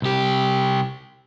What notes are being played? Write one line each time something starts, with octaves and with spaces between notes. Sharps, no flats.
C2 G4